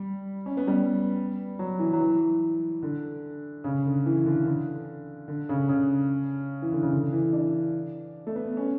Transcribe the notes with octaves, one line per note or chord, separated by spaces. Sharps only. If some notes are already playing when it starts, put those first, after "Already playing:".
Already playing: G3
C#4
B3
G3
F#3
E3
F#3
E3
D3
C#3
D3
E3
D3
D3
D3
C#3
C#3
E3
D3
C#3
D3
E3
D4
A3
B3
C#4